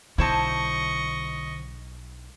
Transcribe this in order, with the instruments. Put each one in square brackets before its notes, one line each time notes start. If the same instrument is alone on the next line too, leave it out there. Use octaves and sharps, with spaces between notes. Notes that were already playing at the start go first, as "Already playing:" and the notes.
[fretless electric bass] B1 [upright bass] D3 [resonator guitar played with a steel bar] E4 C5 A5 [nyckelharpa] D#5 C#6